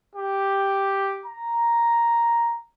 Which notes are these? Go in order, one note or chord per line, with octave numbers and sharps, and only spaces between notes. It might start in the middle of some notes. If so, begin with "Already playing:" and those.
G4
A#5